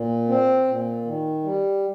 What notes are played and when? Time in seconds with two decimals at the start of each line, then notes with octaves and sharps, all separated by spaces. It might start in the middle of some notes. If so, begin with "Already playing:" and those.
Already playing: A#2
0.28 C4
0.67 A#2
1.05 D#3
1.44 G3